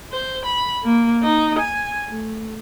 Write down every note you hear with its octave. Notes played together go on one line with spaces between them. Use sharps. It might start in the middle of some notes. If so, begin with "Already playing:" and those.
C5
B5
A#3
D#4
G#5
A3